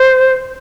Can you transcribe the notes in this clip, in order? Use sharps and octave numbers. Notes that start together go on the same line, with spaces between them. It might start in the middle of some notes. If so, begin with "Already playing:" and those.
Already playing: C5